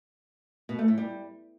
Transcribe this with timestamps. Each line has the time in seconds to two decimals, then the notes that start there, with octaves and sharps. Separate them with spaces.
0.69 B2
0.79 A3
0.88 A2
0.98 G3